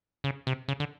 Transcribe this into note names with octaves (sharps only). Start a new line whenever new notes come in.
C#3
C3
C#3
D3